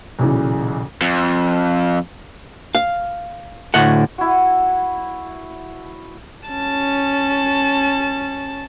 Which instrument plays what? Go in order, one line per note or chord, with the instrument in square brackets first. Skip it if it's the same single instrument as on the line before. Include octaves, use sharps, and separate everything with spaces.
[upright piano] B1 A#2 C#3 E3
[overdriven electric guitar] F2
[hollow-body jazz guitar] F5
D2 A2 F#5
[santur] E4 F#4
[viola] C#4 A5